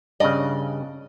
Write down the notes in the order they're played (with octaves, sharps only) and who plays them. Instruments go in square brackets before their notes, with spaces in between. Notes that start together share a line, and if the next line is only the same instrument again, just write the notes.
[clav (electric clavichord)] G2 C#3 [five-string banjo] D5 D#5